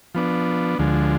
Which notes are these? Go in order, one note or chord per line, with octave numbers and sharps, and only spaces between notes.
F3 B3 D4
D2 D3 F3 G#3